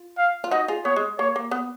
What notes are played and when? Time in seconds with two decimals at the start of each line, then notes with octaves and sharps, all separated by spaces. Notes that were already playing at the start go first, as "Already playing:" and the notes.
Already playing: F4
0.18 F5
0.44 F4
0.51 D#4 F#4 D#5
0.68 F4 G#4
0.85 B3 C#5
0.96 G#3
1.19 A#3 C#5
1.36 A#3
1.51 B3